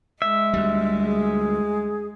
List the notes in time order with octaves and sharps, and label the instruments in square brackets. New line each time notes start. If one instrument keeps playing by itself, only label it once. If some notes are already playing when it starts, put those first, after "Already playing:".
[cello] G#3 [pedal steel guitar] E5
[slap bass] D2 G3
[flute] G#4